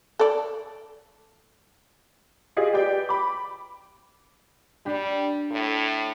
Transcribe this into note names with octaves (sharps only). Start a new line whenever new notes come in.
A4 D5
F4 G4 G#4 D#5
G4 B4 D5 G5
B5 D6
G3 D4 G4
A2